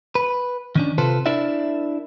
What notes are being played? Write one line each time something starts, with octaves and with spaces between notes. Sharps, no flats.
B4
D#3 C#4 D4
C3 F4 A4 B4 C5
D4 E4 A#4 D5 E5